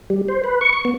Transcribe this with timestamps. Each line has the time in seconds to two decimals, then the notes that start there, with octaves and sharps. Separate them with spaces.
0.10 G3
0.28 C5
0.44 B4
0.61 C#6
0.73 C#6
0.85 B3